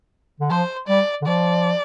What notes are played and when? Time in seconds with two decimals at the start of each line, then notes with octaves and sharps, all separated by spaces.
0.40 D3
0.50 F3 C5
0.88 G3 D5
1.22 D3
1.27 F3 D5